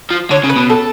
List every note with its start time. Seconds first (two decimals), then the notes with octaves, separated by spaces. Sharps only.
0.10 F3
0.30 D3 C#5
0.44 C#3
0.50 B4
0.56 B2
0.70 A4